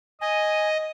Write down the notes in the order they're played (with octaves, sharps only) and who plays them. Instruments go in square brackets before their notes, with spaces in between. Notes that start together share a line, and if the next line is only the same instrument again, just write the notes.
[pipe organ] D#5 [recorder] G#5